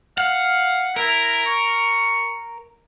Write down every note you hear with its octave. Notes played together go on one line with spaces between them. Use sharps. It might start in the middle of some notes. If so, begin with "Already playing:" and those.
F5 F#5
E4 A#4
C#6